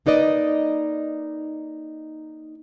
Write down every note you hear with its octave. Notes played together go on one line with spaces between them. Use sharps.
A#3 D#4 B4 D5 D#5